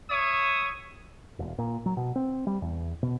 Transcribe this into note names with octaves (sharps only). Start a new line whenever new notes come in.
C#5 E5 D#6
E1
A#2
F#3
B2
C4
G3
E2
B2